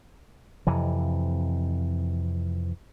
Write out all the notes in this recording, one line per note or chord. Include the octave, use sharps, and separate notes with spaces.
F2 C3 E3